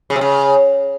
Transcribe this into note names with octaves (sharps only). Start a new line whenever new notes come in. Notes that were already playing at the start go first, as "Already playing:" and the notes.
C#3
C3
C#3